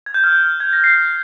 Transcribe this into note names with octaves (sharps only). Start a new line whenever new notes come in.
G#6
G6
F6
G6
G#6
A#6
C7